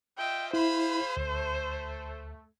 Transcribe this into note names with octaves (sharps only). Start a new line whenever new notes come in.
F4 D#5 E5 G5
E4 G#4 C5 F5 B5
D2 A3